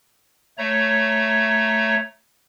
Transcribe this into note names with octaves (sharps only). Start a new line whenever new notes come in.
A3 C#5 A#5